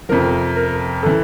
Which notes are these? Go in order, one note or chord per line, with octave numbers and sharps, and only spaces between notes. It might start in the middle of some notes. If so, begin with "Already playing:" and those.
F2 C3 F3 A#4
A#4
A2 E3 A4